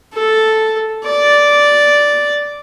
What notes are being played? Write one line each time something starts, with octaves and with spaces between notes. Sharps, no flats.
A4
D5